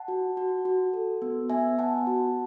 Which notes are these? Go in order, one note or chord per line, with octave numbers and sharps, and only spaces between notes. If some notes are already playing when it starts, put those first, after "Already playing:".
Already playing: F#5 A5
F#4
F#4
F#4
A4
B3
B3 E5 G#5
B3 F#5 A5
F#4